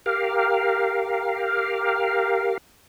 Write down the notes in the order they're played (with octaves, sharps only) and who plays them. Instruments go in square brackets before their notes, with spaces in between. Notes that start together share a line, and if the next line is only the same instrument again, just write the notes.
[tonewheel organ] G4 A#4 F5